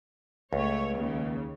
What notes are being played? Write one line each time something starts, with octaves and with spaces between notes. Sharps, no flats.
C#2 A3 C#5
D#2 C#3